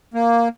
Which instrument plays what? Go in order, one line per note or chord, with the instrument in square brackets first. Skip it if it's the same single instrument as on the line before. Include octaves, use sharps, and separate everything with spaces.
[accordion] A#3